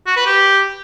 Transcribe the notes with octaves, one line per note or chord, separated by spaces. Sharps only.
F#4
B4
G4